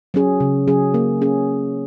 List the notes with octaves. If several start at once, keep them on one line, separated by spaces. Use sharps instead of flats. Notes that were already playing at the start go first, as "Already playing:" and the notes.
F#3 C#4 G#4
C#3
F#3 C#4 G#4
A#3
C#4 G#4